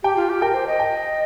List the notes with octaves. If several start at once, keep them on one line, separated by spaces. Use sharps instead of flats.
G4 G5
F4
G4
A#4 G5
C5
D#5
G5